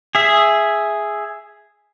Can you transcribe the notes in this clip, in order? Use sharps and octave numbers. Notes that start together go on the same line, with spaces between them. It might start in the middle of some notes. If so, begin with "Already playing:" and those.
G#4 E5